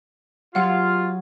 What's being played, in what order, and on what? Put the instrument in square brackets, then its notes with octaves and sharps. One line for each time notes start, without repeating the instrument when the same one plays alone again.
[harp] F#3 [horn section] F4 [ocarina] G4 [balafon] F5 F#5